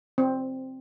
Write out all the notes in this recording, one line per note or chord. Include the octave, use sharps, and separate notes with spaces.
C4